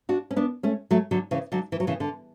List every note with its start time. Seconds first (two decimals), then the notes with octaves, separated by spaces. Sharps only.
0.09 D4 F#4
0.31 C#4
0.36 B3 D4
0.63 A3 C#4
0.91 F#3 A3
1.11 D3 F#3
1.31 C#3 E3
1.52 D3 F#3
1.72 E3
1.80 F#3
1.87 C#3 E3
2.00 D3